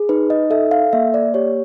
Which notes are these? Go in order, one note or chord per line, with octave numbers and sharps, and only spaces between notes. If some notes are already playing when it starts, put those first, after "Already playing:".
Already playing: G#4
D#4 B4
D#5
A4 E5
F5
A#3 E5
D5
G4 C#5